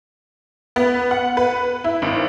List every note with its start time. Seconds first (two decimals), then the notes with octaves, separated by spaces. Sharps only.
0.76 B3
1.11 F#5
1.37 B4
1.84 E4
2.02 G#1